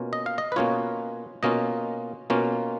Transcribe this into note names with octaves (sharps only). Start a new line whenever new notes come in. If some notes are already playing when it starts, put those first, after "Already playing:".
Already playing: B2 A#3 C#4 F4
D#5
F5
D#5
B4
B2 A#3 C#4 F4 C#5
B2 A#3 C#4 F4 D#5
B2 A#3 C#4 F4